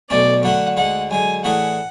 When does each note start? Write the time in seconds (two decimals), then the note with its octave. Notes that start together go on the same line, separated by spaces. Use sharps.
0.10 B1 B2 A3 C#4 D5
0.43 F#2 D3 A3 D4 F#5
0.77 D2 D3 G#3 F#5
1.10 F#2 D3 G#3 G#5
1.44 A2 E3 A3 D4 G#4 F#5